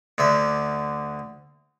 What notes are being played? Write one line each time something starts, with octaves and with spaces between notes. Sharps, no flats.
D2 D3 E5